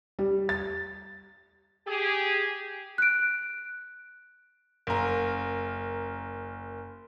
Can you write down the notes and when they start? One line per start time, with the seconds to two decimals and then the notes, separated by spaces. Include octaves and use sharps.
0.19 G3
0.49 A6
1.87 G4 G#4
2.98 F#6 D7
4.87 F#1 A#4